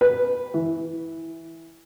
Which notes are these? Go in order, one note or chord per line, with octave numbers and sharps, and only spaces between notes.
B4
E3